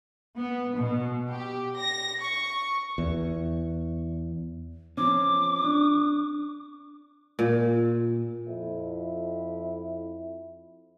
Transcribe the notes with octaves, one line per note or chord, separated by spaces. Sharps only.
B3
B2
G4
A#6
C#6
E2
F3 C4 C#4 D6
D4
A#2
F2 E4